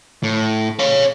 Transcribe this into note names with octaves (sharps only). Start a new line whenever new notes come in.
A2
C#5 F5